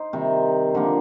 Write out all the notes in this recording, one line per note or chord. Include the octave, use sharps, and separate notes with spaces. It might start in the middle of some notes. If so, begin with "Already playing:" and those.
Already playing: D#4 C5
C3 D#3 G3
D3 F3 A#3